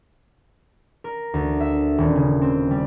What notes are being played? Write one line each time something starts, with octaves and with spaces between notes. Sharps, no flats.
A#4
D2
E5
D#1
C#3
C4
G3